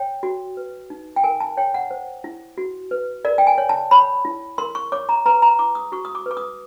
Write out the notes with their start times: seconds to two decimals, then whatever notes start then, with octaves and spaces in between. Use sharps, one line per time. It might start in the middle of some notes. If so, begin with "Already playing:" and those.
Already playing: C#5 G5
0.23 F#4
0.57 B4
0.90 D#4
1.16 G5
1.23 A#4 G#5
1.40 A5
1.57 C#5 G5
1.74 F#5
1.91 C5
2.24 E4
2.58 F#4
2.91 B4
3.25 A#4 D5
3.38 G5
3.47 G#5
3.58 C#5
3.69 A5
3.91 C#5 B5
4.25 E4
4.58 A#4 C6
4.75 C#6
4.92 C#5 D6
5.09 A#5
5.26 B4 A#5
5.42 A#5
5.59 E4 D6
5.75 D#6
5.92 F#4 C#6
6.05 D#6
6.15 D6
6.26 B4 D6
6.37 D#6